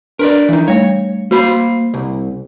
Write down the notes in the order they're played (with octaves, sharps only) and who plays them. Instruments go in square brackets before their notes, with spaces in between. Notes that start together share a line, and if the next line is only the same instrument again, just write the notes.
[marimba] D4 [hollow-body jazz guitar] A#4 B4 D5
[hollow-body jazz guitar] E3 D#4
[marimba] G3 A3 [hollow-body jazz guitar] C#5
[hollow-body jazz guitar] A#3 C5 B5 [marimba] F#4
[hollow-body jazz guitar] C2